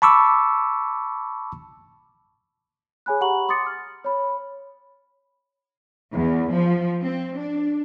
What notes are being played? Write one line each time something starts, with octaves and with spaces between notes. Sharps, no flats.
A5 B5 C#6 D6 E6
G#4 C#5 G#5 B5 F#6
G4 F#5 A#5 B5 C#6 F#7
C6 D6 D#6 A6 C#7
F6
C#5 B5
E2
F3
C4
D4